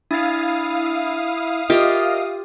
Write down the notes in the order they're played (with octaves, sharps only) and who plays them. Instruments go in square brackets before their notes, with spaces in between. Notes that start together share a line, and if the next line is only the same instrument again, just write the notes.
[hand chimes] D4 A6 [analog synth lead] E4 [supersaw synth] F5 D#6
[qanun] F4 G4 [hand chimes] A#4 E5 [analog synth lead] D#5